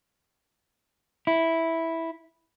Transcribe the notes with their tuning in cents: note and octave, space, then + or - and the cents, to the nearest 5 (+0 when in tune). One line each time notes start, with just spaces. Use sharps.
E4 -5